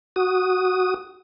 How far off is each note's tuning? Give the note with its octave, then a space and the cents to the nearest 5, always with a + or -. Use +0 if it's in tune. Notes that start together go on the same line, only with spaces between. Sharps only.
F#4 +0 D#6 +0